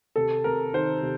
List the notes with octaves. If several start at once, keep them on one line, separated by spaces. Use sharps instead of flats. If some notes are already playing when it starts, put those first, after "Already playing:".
C3 A4
C3 A#4
D#3 C5
C3